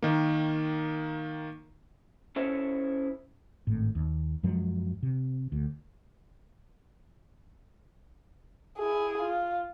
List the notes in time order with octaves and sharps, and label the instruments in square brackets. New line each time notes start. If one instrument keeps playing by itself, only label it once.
[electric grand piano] D#3 A#3
[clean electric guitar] C#4 E4 A4 C5 C#5
[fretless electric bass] G#1 A2
D#2
F#2 F3 F#3 G#3
C3
D2
[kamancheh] E4 G#4
F4